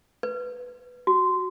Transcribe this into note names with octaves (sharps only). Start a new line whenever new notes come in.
B4
F#4